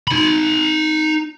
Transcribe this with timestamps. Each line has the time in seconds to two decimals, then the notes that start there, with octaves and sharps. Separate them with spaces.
0.07 D#4 B5